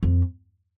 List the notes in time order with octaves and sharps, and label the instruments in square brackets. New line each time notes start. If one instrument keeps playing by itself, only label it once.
[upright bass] F2